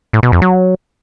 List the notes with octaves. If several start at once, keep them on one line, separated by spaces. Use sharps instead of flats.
A2
B2
F2
F#3